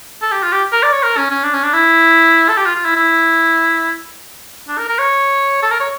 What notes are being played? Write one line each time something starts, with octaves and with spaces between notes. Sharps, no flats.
A4
G4
F4
G4
A#4
D5
C#5
A#4
C#4
C#4
D4
C#4
D4
E4
A4
G4
F4
F4
E4
E4
D4
A#4
A#4
C#5
A4
A#4
C#5